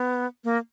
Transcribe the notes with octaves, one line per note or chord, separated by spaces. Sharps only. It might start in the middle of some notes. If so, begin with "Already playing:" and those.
Already playing: B3
A#3